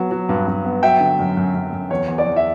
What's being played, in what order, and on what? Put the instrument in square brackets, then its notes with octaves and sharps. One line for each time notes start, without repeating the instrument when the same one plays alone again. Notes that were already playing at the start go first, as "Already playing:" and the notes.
Already playing: [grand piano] F#3 B3
F#3
G2
G2
B3
F#3 E5 G5
D3
F#2
F#2
F#2
F#2
E2 C#5
E2
D5
E2
E5